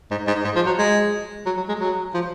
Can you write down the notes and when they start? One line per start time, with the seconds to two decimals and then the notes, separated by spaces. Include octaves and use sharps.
0.11 G#2
0.27 G#2
0.45 G#2
0.56 F3
0.67 F#3
0.78 G#3
1.46 F#3
1.57 F#3
1.69 G#3
1.80 F#3
2.14 F3